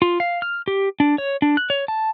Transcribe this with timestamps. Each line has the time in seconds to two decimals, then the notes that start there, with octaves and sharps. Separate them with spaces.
0.02 F4
0.20 F5
0.42 F6
0.68 G4
1.00 D4
1.18 C#5
1.42 D4
1.57 F#6
1.70 C#5
1.88 A5